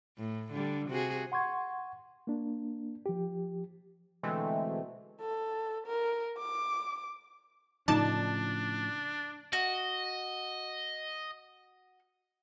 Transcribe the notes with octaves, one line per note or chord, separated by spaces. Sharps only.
A2
D3 G3
C3 F#4 G#4
F#5 C6 C#6 G#6
A#3 D4
F3 G4
B2 D3 E3 G#3 A3 C4
A4
A#4
D6
A2 C#3 F3 D4 D#4 D5 A5
F#4 D#5